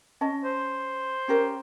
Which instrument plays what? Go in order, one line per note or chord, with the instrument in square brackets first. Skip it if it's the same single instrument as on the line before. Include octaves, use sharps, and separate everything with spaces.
[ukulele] C#4 D#5 A5
[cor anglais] C5
[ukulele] C#4 G4 A#4